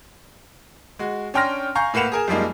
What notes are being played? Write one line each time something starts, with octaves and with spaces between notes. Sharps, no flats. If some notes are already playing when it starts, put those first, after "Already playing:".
G#3 F#4
C#4 D4 G5 C6 F6 A#6
F5 G#5 A#5 C#6 G6
A2 A#3 B4 F#5 E7 F7
G#4 A#4 G#5
F#2 F3 G3 G#3 A#3 D#4